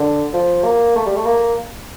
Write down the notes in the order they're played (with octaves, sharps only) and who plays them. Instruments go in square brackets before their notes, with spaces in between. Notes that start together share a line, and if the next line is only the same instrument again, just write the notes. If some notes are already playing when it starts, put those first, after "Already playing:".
Already playing: [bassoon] D3
F3
A#3
A3
G3
A3
A#3